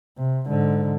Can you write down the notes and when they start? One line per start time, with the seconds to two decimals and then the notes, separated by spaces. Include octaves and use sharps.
0.17 C3
0.47 G#2 D3